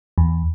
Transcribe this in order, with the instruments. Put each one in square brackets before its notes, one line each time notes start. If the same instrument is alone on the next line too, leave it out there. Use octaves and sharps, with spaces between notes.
[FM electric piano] E2